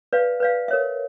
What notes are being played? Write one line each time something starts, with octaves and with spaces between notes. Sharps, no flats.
B4 D5 F5
B4 D5 F5
A#4 C#5 E5